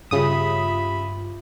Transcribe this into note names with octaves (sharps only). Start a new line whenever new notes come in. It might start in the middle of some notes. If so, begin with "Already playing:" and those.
G2 C#3 F4 G4 E5 B5 D#6